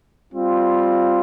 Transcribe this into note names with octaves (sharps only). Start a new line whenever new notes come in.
G3 C4 F4